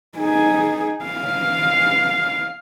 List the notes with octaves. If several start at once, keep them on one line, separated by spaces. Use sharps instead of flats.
D#4 G#4
F5